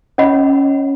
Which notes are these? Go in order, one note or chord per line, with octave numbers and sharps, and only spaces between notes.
C#4 C#5 D#5 F#5 B5